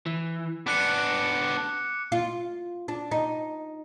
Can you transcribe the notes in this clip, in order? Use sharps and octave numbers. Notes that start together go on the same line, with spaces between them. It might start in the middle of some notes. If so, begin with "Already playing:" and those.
E3
B3 D4 D6 F#6 C#7
F4
D4
D#4